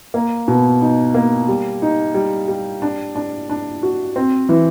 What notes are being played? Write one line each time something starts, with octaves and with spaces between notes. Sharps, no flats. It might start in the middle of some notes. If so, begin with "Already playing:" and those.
A#3
B2
D#4
A#3
G3
D#4
G3
G3
D4
D4
D4
F#4
C4
E3